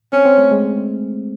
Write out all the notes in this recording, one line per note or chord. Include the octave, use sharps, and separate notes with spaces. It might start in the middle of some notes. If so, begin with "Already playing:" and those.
C4 C#4
C4
A3
G#3